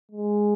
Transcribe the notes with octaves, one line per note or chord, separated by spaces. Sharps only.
G#3